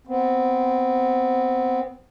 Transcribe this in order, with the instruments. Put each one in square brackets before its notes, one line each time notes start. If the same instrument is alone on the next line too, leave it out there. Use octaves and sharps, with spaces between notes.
[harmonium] B3 C4